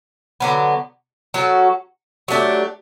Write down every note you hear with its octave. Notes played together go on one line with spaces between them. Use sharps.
D3 F#3 B3
F#3 C#4 F#4 A4
F#3 A3 D4 G4